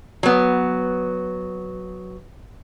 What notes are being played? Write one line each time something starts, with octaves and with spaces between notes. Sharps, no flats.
F#3 B3